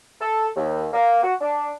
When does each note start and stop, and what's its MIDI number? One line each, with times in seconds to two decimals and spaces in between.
0.20 0.48 69
0.56 0.86 39
0.93 1.22 58
1.23 1.34 66
1.41 1.70 62